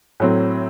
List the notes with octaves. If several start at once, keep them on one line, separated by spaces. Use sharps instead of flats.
A2 F#3 C4